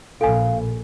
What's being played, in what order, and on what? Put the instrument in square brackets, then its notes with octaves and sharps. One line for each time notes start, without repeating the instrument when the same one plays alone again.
[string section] A#1 [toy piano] A4 G#5 [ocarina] F5